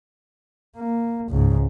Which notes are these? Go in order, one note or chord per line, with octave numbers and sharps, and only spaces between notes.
A#3
C#2 G#2